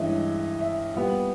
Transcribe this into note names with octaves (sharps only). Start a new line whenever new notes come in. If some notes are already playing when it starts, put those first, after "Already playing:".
Already playing: G2 E3 G#3 C#4 D#5 E5
E5
A#2 G3 B3